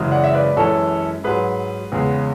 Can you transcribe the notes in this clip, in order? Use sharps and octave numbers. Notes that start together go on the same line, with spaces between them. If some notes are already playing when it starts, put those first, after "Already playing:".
Already playing: F#2 C#3 E3 G#3
D5 F#5
E5
B4 D5
D5
F#2 E3 G#3 A4 C#5
G#2 F#3 G#4 B4
E2 C#3 G#3